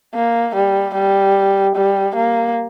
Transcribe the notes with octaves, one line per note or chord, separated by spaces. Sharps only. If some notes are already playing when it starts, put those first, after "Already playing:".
A#3
G3
G3
G3
A#3